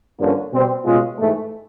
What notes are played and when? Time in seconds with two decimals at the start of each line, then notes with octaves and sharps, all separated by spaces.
0.19 G2 D3 F3 A#3 C#4
0.52 B2 G3 C4
0.85 B2 G#3 C#4 F4
1.18 G#2 E3 A3